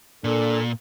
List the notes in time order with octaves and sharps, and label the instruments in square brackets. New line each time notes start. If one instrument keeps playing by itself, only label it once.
[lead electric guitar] A#2 [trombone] D4 [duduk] A4